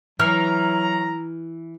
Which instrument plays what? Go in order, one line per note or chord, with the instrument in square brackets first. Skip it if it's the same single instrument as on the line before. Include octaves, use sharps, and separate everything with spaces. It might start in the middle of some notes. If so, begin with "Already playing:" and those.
[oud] E3 [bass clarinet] F#3 [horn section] A#5 [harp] F6